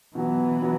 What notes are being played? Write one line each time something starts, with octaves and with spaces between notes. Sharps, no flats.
B2 E3 F#3 B3
B2 F#3 B3